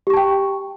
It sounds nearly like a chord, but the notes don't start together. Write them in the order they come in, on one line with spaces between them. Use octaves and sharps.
G4 C#6 A5 G5